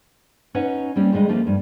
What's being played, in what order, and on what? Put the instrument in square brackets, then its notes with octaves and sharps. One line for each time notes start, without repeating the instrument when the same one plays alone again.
[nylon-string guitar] C#4 D#4 B4 C#5 F#5
G3 A#3 C4 C#4
F2 D3 G3 G#3 D#5
F3 A3 A#3 F4
G2